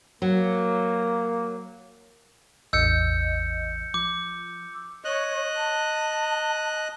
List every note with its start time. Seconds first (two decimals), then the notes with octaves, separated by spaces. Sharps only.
0.22 F#3 A#3
2.73 A1 E2 D#5 E6 G6 C#7
3.94 F3 D6
5.05 C#5 D#5 F#6
5.55 A5